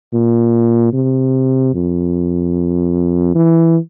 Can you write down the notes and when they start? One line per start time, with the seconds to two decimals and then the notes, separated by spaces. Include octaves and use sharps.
0.14 A#2
0.93 C3
1.74 F2
3.35 E3